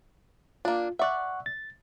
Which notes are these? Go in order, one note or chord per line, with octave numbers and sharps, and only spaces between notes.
A#3 D4 F4
D5 E5 F#5 C#6 F#6
A6